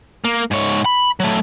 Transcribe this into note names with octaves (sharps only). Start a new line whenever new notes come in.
A#3
G#2 C#5
B5
F#3 A3